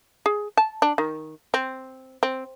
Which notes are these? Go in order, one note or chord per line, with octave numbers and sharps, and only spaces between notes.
G#4
A5
D4
D#3
C4
C4